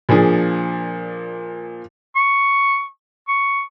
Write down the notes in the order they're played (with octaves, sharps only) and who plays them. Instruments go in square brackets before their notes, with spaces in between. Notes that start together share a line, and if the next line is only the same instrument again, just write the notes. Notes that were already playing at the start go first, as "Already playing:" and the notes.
[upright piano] A#2 F3 D4 G#4
[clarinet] C#6
C#6